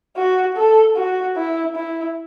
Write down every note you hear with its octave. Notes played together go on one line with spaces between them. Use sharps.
F#4
A4
F#4
E4
E4